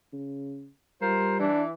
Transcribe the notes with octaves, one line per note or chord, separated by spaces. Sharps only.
C#3
G3 F4 A#4 C5
E3 D4